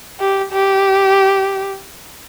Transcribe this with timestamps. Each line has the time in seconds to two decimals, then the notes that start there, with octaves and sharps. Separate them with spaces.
0.20 G4
0.52 G4